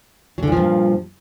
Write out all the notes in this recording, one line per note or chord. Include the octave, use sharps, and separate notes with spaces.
G2 A#2 D3 F3 F#3